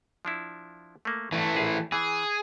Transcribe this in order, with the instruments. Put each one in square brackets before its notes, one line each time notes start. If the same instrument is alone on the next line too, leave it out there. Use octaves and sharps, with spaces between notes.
[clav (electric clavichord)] F3 D4 E4
A3 A#3
[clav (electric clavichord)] G2 [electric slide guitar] E3 A3
[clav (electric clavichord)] A#1 G#4 F5
[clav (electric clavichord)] E3 [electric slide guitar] G#4